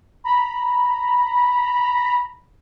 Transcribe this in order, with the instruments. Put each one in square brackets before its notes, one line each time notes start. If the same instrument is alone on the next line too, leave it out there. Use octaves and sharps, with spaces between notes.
[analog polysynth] A#5 B5